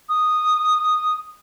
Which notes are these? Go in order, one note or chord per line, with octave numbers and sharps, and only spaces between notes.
D#6